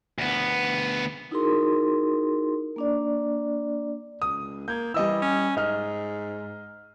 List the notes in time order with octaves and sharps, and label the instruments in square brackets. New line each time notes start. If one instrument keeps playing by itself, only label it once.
[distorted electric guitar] D2 B3
[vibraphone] D#4 E4 F#4 G#4 A#4 C6
A#3 D4 D5
[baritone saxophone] C#2 [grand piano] D#6
[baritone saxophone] A#3 [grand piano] G6 G#6
[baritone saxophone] E3 [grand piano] G3 D#5 E6
[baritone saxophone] C#4
[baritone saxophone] G#2 [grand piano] D#5 F6